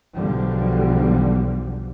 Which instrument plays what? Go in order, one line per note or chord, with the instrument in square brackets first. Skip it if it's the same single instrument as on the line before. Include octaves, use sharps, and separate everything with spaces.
[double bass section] B1 E2 D3 F3 G3